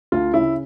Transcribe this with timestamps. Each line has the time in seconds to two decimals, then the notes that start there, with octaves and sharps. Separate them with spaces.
0.12 D2 F4
0.33 C#3 E4